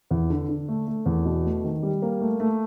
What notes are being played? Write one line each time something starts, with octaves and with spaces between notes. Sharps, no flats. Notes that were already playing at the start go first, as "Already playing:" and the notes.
E2
D3
D3
A3
A3
E2
B2
A3
D#3
G3
A#3
A3
A3